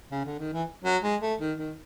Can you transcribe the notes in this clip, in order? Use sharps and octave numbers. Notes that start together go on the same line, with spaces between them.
C#3
D3
D#3
E3
F#3
G#3
A3
D#3
D#3